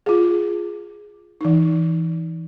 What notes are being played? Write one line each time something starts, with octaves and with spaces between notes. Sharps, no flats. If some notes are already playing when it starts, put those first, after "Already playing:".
F4 G#4
E3 D#4